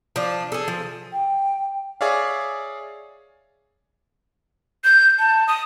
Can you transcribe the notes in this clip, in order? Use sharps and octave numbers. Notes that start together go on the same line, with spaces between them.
F3 D4
G#4 A4
F3
G5
G#4 C#5 D5 E5 F5
G6
A5
D#6